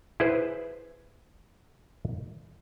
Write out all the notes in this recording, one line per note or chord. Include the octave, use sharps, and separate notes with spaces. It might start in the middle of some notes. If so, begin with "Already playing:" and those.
E4 G#4 B4 C5